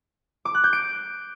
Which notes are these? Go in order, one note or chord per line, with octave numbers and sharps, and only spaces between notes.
D6
F#6
G6
D7